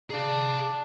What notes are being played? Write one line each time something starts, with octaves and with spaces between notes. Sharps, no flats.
D4 G#4 F5